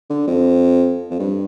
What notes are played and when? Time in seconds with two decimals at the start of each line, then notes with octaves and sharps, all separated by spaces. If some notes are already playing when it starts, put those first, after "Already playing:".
0.10 D3
0.28 F2
1.10 F2
1.19 G2